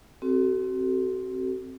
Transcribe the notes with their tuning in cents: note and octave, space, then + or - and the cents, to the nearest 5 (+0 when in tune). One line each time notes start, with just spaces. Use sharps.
C4 +0 F#4 +35 A4 +0